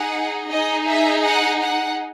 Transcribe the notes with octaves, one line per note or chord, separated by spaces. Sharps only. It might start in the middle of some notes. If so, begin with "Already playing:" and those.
Already playing: D#4 G#4 F#5
D#4 G#4 D#5
E5
F#5
F#5